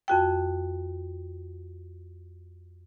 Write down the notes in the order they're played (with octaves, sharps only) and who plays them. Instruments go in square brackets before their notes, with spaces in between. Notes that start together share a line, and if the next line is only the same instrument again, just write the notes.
[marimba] F2 F#4 G5